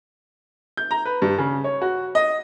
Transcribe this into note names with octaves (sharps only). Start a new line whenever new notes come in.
G6
A#5
B4
G2
C#3
C#5
F#4
D#5